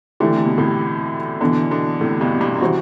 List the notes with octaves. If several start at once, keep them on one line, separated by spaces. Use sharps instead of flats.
D3 E3 A3 E4 G4
C3
B2
A2 C3
B2 D3 E3 B3 D4
B2 D3
A2 C3
G2 B2
G2 B2
F#2
C3 E3 G3 C4 F#4